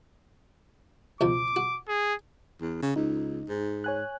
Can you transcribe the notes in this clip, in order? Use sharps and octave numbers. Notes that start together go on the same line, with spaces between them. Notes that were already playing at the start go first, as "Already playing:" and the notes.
C#2 B2 F3 D6
F#4
G#4
E2
C#3
C#2 D#4
G#2
C#5 G#5 F#6